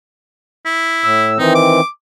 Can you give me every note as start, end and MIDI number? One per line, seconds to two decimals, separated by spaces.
0.65 1.32 64
1.04 1.38 45
1.04 1.38 88
1.39 1.80 51
1.39 1.80 52
1.39 1.80 60
1.39 1.52 63
1.55 1.88 86